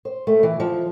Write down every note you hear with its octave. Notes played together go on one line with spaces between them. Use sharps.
C5
A3
E3
F3